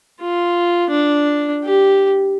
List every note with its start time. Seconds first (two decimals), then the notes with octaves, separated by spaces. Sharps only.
0.21 F4
0.90 D4
1.64 G4